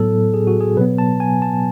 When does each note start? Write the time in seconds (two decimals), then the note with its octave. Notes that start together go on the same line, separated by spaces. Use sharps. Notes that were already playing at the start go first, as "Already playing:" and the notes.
Already playing: A2 F#3 B3 A4
0.34 G#4
0.47 F#4
0.61 G#4
0.77 B2 F#3 B3 B4
0.98 A5
1.20 G#5
1.42 A5